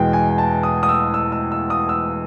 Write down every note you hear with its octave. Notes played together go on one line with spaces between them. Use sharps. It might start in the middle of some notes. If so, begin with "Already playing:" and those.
Already playing: E2 B2 G#3 G5
G#5
G#5
A5
D#6
D#6
E6
E6
E6
E6
D#6
E6